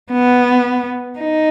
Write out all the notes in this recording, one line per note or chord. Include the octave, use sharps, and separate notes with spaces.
B3
D#4